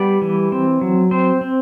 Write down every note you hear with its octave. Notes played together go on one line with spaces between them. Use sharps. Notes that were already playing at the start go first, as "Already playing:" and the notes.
Already playing: G3 B3 D5
E3
C4
F#3
C4 C5
C4